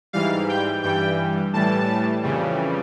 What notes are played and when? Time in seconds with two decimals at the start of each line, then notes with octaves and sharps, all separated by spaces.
0.13 G#2 E3 G3 F5
0.49 G5
0.83 G2 E3 G3 G5
1.53 A2 E3 G3 A5
2.23 F2 C#3 E3 G3